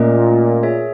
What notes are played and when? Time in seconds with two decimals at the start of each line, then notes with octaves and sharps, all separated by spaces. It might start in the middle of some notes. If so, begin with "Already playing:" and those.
Already playing: A#2 A3 C#4 F4 A#4 D#5
0.63 G#4 C#5 E5